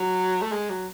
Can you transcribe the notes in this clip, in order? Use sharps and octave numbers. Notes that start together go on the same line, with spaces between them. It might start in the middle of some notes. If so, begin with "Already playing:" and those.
Already playing: F#3
A3
G#3
F#3